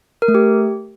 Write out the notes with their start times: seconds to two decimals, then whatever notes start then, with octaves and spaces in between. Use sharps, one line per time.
0.22 A#4
0.28 A3
0.35 G4